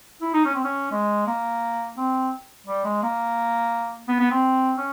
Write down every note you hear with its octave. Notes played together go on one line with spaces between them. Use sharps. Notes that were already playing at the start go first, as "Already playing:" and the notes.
E4
D#4
C#4
C4
C#4
G#3
A#3
C4
G3
G#3
A#3
B3
B3
C4
C#4